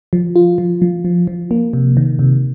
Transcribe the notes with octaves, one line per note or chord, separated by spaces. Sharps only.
F3
F4
F3
F3
F3
F3
A#3
C3
D#3
C3